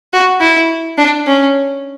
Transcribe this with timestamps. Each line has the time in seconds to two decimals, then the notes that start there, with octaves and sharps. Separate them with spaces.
0.13 F#4
0.41 E4
0.98 D4
1.27 C#4